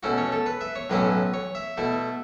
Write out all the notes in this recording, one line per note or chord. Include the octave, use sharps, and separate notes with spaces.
B2 A3 C#4 E4 F#4
C#5
A4
B4
E5
C#5
B1 A2 F#3 C#4 E4 B4
C#5
E5
B2 A3 E4